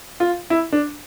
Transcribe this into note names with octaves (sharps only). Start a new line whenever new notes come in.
F4
E4
D4